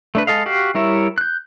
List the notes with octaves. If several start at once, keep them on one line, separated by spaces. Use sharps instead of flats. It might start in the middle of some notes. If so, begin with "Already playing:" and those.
A3 D4 B4
G#3 A4 D#5 F5
F#4 G4 F5
G3 E4 A#4 C#5 E5
F#6 G6